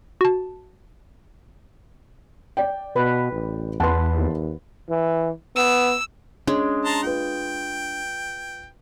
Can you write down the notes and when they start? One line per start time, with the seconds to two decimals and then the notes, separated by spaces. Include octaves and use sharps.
0.21 F#4 A5
2.57 D5 G5
2.96 B2 B4
3.32 A1
3.80 E2 B4 F#5 A5 C6
4.15 D#2
4.90 E3
5.56 B3 E6
6.47 G#3 C#4 D4
6.85 A5 A#5 C6
7.03 F4 B4 G5